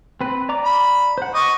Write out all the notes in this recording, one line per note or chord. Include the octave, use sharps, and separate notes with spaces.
C4 B4
D5 A#5 D6
B5
C5 F#5
D#5 C#6 D6